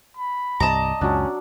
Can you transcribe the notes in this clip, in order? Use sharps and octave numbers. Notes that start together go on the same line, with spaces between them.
B5
C2 G2 D5 D#5 A5 A#5 D6
C#2 F#2 F#3 C#4 D4